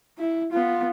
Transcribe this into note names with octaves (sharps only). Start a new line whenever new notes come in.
E4
B3 F4